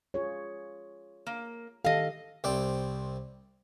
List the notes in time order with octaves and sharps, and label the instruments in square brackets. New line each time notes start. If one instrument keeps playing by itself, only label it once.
[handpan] F4 G#4 C#5
[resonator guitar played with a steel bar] A#3
[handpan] D#3 G4 A4 [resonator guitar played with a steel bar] D#5 F5
[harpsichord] C2 C4 D5 G5